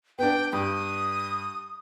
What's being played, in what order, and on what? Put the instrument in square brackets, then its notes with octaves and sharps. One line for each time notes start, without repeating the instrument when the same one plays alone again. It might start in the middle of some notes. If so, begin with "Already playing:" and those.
[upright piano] B3 D4 [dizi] G5
[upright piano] G2 [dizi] D#6